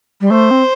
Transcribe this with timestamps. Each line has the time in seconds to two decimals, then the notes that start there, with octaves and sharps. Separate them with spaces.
0.21 G3
0.30 A3 C5
0.51 C4